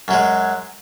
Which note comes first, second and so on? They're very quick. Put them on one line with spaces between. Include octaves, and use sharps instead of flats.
F#2 F#3 G#3